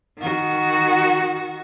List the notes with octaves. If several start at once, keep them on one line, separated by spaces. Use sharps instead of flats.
D#3 F#4